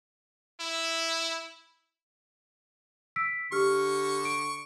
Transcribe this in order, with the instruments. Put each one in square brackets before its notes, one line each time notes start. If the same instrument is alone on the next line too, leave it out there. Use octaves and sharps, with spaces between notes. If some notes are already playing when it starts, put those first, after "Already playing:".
[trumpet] E4
[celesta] E6 B6 D7
[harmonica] D3 C#6 [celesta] G4 F6
[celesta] D7